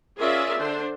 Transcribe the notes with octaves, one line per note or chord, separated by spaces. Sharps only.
C#4 F4 G#4 A#4 D5 E5
D3 D4 C5